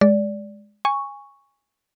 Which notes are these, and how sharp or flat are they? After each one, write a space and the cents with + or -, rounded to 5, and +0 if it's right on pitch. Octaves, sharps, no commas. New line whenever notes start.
G#3 +0 D5 -15
G#5 -15 C#6 +0